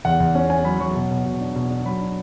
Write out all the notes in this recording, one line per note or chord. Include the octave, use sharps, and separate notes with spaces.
E2 F#5
E2
C#4
C#4 G#5
F#3 B5
F#3 C#6
B2
B2
B2
D4
B2
D4
F#3 B5
D4